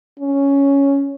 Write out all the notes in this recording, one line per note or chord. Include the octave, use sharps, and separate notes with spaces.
C#4